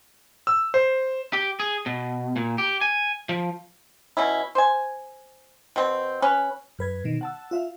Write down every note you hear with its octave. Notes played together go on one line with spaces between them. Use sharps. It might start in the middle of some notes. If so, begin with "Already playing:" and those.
E6
C5
G4
G#4
B2
A#2
G4
G#5
F3
B2 C#4 E4
C5 G#5
B2 C4
C#4 B4
F#2 B4 G#6
B2 D#3
F#5 A5 E6
F4 E5 F5